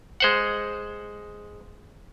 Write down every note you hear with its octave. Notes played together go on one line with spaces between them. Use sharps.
G#3 C5 F#5